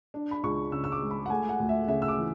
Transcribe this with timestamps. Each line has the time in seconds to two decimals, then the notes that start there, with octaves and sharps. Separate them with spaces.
0.14 D4
0.31 B5
0.43 C#2 C#6
0.72 C#3 E6
0.84 E6
0.92 D6
1.02 G#3
1.11 B5
1.26 F#5
1.30 A3 G#5
1.49 F#5
1.60 D2
1.69 E5
1.88 C#3 E5
2.02 E6
2.08 D6
2.18 E3